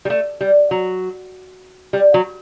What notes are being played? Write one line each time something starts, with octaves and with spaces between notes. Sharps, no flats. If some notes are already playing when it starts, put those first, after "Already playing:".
G3
A3
G3
F#3
G3
F#3